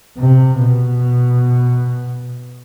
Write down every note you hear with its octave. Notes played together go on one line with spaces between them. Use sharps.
C3
B2